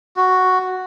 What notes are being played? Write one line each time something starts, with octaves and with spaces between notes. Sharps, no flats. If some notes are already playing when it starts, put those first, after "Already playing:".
F#4